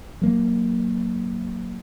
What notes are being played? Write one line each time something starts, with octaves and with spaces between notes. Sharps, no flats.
F#3 A#3